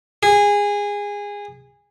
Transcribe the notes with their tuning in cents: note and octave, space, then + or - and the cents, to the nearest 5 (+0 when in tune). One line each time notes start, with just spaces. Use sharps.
G#4 -20